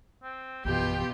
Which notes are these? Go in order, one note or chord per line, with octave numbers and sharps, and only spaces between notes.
C4
A#1 F#2 B2 E3 F4 G4 G5